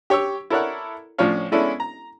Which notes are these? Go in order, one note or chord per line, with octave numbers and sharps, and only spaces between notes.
G4 C#5 C#6 E6
E4 A4 A#4 C#5 D5 F#5
A2 F3 C#4 D4 C#5 F5
G#3 B3 C#4 D4 E4 A4
A#5